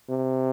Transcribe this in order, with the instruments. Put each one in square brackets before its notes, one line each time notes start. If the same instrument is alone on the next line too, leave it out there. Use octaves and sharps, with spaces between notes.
[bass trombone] C3